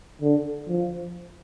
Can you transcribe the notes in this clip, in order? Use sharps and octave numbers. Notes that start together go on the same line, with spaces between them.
D3
F3